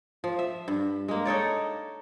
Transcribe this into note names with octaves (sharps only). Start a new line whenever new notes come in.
F3
E5
G2
G#3 A#3
D#4 A4 C#5 D5